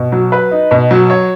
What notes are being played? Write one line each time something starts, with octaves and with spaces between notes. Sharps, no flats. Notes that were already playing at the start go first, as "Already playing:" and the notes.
Already playing: B2
F#3
B4
D#4
B2
F#3
C#5